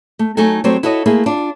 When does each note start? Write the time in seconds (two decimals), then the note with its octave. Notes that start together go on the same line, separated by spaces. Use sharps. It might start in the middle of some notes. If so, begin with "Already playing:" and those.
0.19 A3
0.37 F#3 A3 D#4 A4 G#5
0.64 F#3 G3 A3 C4 C5 C#5
0.83 E4 F#4 A4 C#5 D#5
1.06 A3 A#3 E4 G#4
1.26 D4 F4